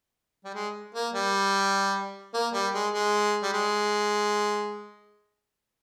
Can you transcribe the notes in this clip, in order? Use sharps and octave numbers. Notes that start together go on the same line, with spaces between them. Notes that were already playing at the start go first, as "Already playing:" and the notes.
G3
G#3
A#3
G3
A#3
G3
G#3
G#3
G3
G#3